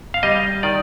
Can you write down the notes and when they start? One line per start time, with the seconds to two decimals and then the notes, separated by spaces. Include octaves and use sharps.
0.14 F5
0.23 G3 D#5
0.63 D#3 D5